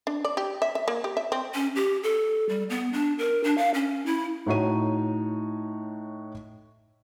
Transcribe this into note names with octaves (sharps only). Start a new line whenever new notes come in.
D4
D5
G4
E5
E5
A#3
G4
E5
C4
C#4
G4
A4
G3
B3
D4
A#4
D4
F5
C#4
E4
A2 D#4 F#4 C#5 D#7